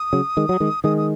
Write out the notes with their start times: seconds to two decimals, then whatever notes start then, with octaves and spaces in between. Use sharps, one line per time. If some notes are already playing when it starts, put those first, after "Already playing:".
Already playing: D#6
0.13 C#3 F#3
0.37 D#3 G#3
0.49 F#3
0.60 D#3 G#3
0.84 D#3 G#3 D#6
0.98 D#6